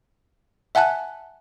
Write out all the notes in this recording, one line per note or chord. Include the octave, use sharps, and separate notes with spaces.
E5 F#5 G#5 A5 F#6